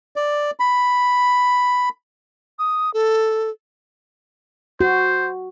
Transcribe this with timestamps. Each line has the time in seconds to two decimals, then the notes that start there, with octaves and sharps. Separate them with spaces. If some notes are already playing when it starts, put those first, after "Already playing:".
0.16 D5
0.60 B5
2.59 D#6
2.94 A4
4.81 F#4 C5